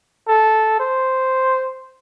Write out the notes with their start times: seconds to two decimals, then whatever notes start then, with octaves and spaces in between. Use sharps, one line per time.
0.28 A4
0.80 C5